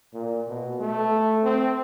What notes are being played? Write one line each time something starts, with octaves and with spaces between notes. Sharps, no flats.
A#2
B2
A3
C4